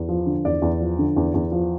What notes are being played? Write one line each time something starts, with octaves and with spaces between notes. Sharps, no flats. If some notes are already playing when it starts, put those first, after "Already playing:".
Already playing: E2
F3
D3
E2 D5
E2
F3
D3
E2
E2
F3